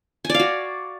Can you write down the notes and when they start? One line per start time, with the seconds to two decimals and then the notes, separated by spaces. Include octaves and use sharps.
0.25 G#5
0.30 D5
0.35 F5
0.39 F#4